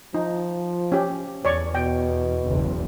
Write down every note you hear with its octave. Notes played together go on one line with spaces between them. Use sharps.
F3 D#4
C#4 G4
E2 C#5 D5 C#6
B2 G5
F#1 B1 E2